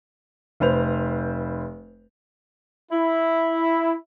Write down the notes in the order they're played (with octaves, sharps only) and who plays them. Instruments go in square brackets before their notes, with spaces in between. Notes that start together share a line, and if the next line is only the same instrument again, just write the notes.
[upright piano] F1 B4 C5 F7
[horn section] E4